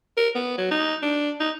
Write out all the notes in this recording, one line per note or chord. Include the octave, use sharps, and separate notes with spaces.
A#4
B3
F#3
D#4
D4
D#4